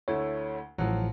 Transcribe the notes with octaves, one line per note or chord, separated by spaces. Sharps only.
D2 A3 E4 C#5
A1 A2 F3 F#3